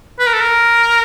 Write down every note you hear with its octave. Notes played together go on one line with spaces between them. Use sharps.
B4
A#4
A4
A#4